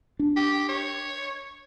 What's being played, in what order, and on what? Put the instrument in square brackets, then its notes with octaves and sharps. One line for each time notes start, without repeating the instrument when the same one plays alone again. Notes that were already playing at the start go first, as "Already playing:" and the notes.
[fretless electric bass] D4
[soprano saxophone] G4
C#5